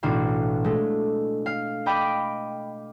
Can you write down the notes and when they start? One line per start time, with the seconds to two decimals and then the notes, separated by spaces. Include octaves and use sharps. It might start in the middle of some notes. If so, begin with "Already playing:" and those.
0.03 A1 B2 D4 F#4 F5
0.64 G#3 A3
1.46 F5
1.86 D#5 G5 B5 D6